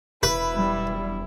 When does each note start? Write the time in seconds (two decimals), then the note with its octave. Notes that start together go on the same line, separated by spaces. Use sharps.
0.23 E1 E4 B4
0.55 F#2 G3